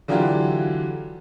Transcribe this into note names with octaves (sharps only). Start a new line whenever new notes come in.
D3 E3 F#3 D4 F4 G4